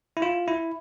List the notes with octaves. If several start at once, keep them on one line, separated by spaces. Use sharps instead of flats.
E4
F4
E4